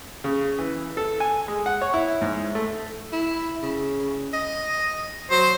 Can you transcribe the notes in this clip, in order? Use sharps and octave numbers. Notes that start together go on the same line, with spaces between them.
C#3
E3
A4
G#5
G#3
F#5
C#5
E4
G#2
A3
E4
C#3
D#5
F#3 C5